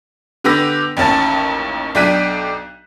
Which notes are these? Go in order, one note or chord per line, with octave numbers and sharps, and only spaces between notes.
D3 B3 G4 B4 E6 A#6
A1 D#2 C#4 A5 A6
B1 D4 G5 F#6 B6 D#7